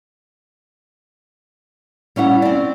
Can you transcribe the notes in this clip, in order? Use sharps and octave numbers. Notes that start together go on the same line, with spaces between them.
G3 C#4 E4 F#5
C4 D5